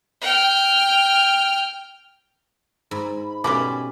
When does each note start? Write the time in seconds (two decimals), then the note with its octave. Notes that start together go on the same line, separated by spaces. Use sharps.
0.21 G5 F6
2.91 G#2 B5
3.44 B2 G3 C#4 G#5 B5 D6